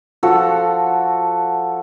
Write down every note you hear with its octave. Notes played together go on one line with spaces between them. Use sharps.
F3 F#4 A4